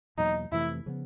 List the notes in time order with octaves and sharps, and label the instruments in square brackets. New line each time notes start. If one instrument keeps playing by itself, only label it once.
[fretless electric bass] E2 B2 F#3 A#3 [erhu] D#4
[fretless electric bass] F2 C3 E3 A3 [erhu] E4
[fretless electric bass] C#3 F3 G#3 B3